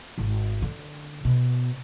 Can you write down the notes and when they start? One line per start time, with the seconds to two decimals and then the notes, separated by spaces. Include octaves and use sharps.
0.18 G#1
0.62 D3
1.25 B2